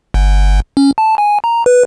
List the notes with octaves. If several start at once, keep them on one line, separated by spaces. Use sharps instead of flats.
G1
C#4
A5
G#5
A#5
B4